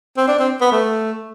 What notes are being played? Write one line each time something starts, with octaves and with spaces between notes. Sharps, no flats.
C4
D4
C4
B3
A3